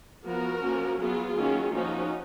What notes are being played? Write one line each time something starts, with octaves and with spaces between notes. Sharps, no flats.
F3 B3 F#4 A#4
F3 A#3 C#4
F#3 B3 F4 G#4
D#3 F#3 A#3 C#4
F3 A#3 C#4 D#4 F#4